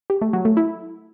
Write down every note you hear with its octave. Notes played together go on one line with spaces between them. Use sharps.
G4
A3
F#3
A3
E4